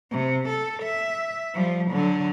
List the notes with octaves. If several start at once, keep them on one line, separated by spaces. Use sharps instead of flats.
C3
A4
E5
F3 G3
D3 F#3